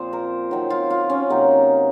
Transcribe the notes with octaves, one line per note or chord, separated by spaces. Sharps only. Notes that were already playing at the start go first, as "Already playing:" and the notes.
Already playing: A#2 F3 C4 C5
A#4
D#3 F#3 C4
F4
F4
C#4
C3 F#3 A#3 D#4